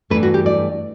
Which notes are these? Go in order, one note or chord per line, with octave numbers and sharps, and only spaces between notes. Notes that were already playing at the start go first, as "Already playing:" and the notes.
G2 E3 A3 B4
F#4
G4
D5